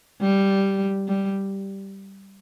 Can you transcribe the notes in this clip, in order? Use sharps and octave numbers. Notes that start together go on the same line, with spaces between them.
G3
G3